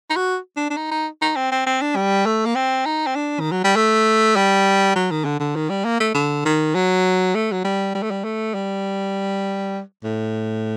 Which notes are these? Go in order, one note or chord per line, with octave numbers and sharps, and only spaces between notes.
D#4
F#4
D4
D4
D#4
D#4
D#4
C4
C4
C4
D4
G3
A3
A#3
C4
D#4
C4
D4
D#3
F#3
G3
A3
G3
F#3
D#3
D3
D3
D#3
G3
A#3
A3
D3
D#3
F#3
A3
F#3
G3
G3
A3
G3
A3
G3
A2